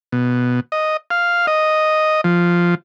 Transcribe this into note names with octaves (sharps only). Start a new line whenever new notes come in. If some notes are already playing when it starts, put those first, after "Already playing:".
B2
D#5
F5
D#5
F3